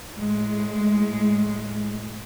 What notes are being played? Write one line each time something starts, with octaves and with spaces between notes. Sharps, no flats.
A2 G#3